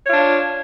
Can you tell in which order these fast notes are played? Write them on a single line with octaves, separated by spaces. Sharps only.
C#5 F4 D4